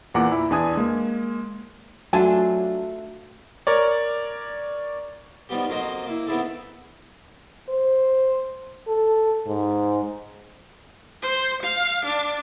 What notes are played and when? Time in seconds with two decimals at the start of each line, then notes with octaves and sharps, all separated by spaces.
0.14 E2 A#2 F#5 A#5 D6
0.32 E4
0.50 E2 D4 G#5 D#6 G#6
0.77 G#3 A#3
2.13 F#3 A3 D4 F4 F#4 F#5 G#5 A5
3.67 A#4 C#5 D5
5.49 D#3 F3 G3 B3 G4
5.68 F2 F#3 A#3 C5 D#5
6.06 A#3 E4
6.27 D#3 B3 C4 E4 G#4 A4
7.69 C5
8.88 A4
9.47 G#2
11.22 C5
11.62 F5
12.05 D4